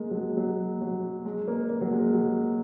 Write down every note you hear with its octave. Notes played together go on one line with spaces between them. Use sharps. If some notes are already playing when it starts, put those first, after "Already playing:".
Already playing: G#3 A#3
F#3
G#3
F#3
F#3
G#3
A#3
A#3
F#3
G#3
F#3